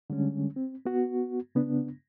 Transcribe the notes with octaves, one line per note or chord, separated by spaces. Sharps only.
D3 G3 G#3 C#4
C4
B3 F#4
C#3 B3 D4